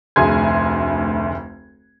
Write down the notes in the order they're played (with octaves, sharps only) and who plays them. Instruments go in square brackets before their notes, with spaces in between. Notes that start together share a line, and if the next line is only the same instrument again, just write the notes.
[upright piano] F1 D2 G#4 G#5 C6 G#6